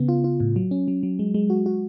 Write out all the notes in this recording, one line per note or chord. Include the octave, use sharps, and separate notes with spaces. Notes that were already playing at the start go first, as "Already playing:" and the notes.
Already playing: C#3 B3
F4
F4
A2
F#3
C#4
F#3
F#3
G#3
G#3
F#4
F#4